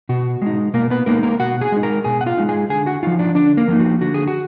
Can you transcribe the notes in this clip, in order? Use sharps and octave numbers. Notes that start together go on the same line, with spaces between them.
B2 F#4
G#3 D#4
B2 A#3 A#4
B3 B4
G#3 A#3 D#4 A#4
A#3 A#4
B2 F#4 F#5
G#4 G#5
G#3 D#4
A#4 A#5
B2 G#4 G#5
F#5
F4 F5
G#3 D#4
G#4 G#5
D3 G#4 G#5
F#4 F#5
F3 A#3 D#4 F4 F5
D4 D5
D3 D4 D5
A#3 A#4
F3 A#3 D#4
F#4
D3 F#4
G#4
F#4